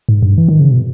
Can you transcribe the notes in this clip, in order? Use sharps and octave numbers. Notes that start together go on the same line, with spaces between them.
G#2
G2
E3
D#3
C#3
B2